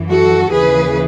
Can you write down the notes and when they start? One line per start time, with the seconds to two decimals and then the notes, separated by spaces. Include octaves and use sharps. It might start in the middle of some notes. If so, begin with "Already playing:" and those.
Already playing: F#2 E3
0.09 F#4 A4
0.51 D#2 C#3 E3 G#4 B4